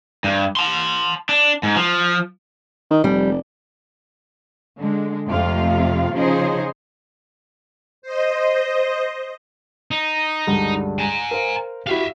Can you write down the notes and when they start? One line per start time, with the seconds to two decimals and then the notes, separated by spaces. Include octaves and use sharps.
0.24 G2
0.57 A5 C6
1.29 D4
1.63 G#2
1.76 F3
2.91 D#3
3.04 F1 G3
4.78 D3 G#3
5.27 F2 C3 A3 F4 F5
6.13 C#3 F3 D#4 G#4 C5 D#5
8.02 C5 D#5
9.91 D#4
10.47 C#2 G2 D3
10.99 G#5 A#5
11.31 A#4 C5 F5
11.87 E4 F#4 G4 E5 F5